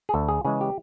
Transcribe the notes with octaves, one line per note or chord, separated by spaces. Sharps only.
G#4
D2 A4
G#4
C#3 E3 G#3 G#4
G4